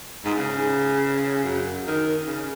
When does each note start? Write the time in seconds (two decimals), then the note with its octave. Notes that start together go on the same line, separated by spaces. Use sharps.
0.25 G#2
0.38 C#3
1.44 F#2
1.87 D#3
2.27 C#3